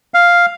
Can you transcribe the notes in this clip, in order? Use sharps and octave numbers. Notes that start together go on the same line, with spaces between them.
F5